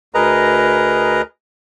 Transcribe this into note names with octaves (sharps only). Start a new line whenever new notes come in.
D2 G#4 A#4 B4 D#5 A#5